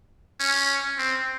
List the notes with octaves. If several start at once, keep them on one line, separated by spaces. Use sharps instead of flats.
C#4
C4